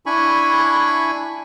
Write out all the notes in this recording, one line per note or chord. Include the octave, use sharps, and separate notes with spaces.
D4 E4 G#5 B5 C#6